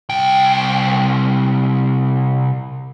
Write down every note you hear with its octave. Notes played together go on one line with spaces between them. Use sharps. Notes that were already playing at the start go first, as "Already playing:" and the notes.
C2 G5